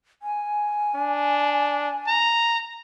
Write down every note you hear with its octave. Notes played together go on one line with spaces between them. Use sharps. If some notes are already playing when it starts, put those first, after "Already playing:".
G#5
D4
A#5